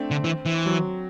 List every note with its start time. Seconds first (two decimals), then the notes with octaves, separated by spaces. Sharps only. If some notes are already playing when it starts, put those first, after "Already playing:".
Already playing: A3 C4 D4
0.11 D3
0.24 E3
0.46 E3
0.66 F#3